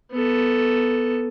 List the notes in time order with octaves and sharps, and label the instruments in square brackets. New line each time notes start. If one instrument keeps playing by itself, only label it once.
[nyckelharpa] B3 A4